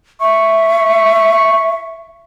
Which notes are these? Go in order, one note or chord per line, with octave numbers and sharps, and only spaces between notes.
E5 C#6